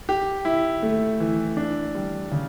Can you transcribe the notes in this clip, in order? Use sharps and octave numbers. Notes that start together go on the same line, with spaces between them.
G4
E4
A3
E3
D4
G3
C#3